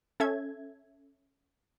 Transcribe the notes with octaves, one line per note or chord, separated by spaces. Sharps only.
C#4 A4 E5 G#6